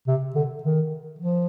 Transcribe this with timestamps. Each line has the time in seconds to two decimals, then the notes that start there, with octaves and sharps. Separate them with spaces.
0.07 C3
0.35 D3
0.63 D#3
1.19 F3